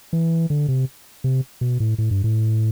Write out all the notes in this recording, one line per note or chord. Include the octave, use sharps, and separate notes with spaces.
E3
D3
C3
C3
B2
A2
A2
G2
A2